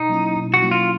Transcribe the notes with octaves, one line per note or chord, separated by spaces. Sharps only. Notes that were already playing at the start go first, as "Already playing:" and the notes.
Already playing: B2 D#4
F#3 A#3 C#4 E4
B2
F#4
F#3 A#3 C#4 E4
F4